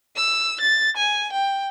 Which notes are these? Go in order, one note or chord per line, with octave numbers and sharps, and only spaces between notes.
E6
A6
G#5
G5